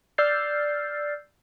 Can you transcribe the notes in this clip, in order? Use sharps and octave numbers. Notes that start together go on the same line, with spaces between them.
D5 E6 F6 G6 A6 C7